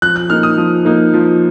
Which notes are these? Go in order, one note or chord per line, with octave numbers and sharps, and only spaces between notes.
F3 F#6
F#6
A#3 D#4 F6
D#6
F3
A#3 D#4
F3